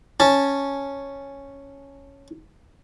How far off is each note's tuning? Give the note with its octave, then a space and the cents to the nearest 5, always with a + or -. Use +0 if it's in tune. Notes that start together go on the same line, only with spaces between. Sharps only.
C#4 +0 A5 +0